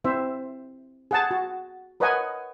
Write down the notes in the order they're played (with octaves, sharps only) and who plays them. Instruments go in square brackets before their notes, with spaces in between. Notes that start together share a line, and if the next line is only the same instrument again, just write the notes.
[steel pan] C4 E4 C5 E5
G#4 F#5 A5
F#4
A#4 B4 C#5 D#5 F#5 G#5